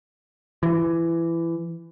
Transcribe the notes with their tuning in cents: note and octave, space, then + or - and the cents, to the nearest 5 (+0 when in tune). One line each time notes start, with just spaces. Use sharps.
E3 +20